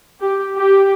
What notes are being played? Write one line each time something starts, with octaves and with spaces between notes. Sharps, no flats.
G4
G4